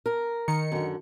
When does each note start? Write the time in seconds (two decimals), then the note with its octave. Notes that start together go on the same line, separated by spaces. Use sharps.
0.06 A#4
0.48 D#3 C#7
0.72 F#2 D3